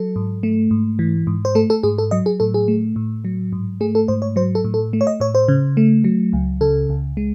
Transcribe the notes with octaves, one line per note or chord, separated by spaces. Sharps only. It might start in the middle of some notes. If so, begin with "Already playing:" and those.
Already playing: F#3 A4
G#2
A3
G#2
E3
G#2
C5
A3 A4
A4
G#2 G#4
A4
F#3 D#5
G#4
A2 A4
G#4
A3
A2
F#3
G#2
A3 G#4
A4
G#2 C5
C#5
F#3 C5
A4
A2
A4
A3
C#5
D#5
A2 C#5
C5
C#3
A3
F#3
C#2
C#3 A4
C#2
G#3